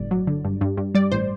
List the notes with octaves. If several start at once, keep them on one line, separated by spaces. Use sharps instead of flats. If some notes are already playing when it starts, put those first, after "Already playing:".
Already playing: G1 A2 D5
F#3
D3
G2
G2
G2
G3 D5
A1 C5